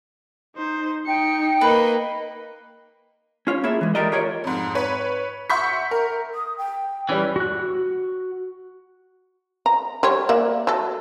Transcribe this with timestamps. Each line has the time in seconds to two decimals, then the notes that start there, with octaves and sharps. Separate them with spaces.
0.56 D#4 C5
1.06 D#4 G5 C#7
1.61 A#3 B4 D#5
3.47 C#4 F4 C#5
3.64 A#3 C#4 E4 G#4 A4 E5
3.81 E3 G#3
3.95 F4 G4 A4 A#4 D5 D#5
4.12 F4 G4 A#4 C#5 D5
4.44 F2 G#2
4.75 B4 C#5
5.50 E5 F#5 C6 C#6 G6 B6
5.91 A#4
6.34 D#6
6.58 G5
7.09 E3 G3 C#4
7.36 F#4 F#6
9.66 A#5
10.03 G3 C5 C#5
10.29 A#3 D5 E5
10.67 F#3 A4